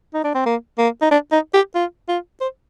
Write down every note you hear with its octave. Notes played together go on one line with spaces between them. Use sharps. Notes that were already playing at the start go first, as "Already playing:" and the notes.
D#4
D4
C4
A#3
A#3
D#4
D4
D#4
G4
F4
F4
C5